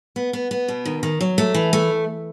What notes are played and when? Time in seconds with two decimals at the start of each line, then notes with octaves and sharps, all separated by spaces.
0.16 B3
0.33 B3
0.51 B3
0.68 B2
0.85 D#3
1.03 D#3
1.21 F#3
1.38 A3
1.54 E3
1.73 A3